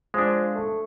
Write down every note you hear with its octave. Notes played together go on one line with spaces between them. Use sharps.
F3 G#3 D4
A3